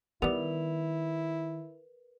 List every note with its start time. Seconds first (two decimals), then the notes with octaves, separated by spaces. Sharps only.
0.22 D#3 G3 B3 E4 A#4 B4 F7